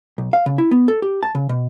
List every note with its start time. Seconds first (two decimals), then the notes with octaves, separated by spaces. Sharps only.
0.18 B1
0.33 F5
0.46 C#3
0.58 E4
0.71 B3
0.88 A4
1.02 G4
1.23 A5
1.35 C#3
1.49 B2